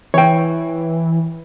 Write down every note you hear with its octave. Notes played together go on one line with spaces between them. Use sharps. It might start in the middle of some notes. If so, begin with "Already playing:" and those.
E3 C#5 G5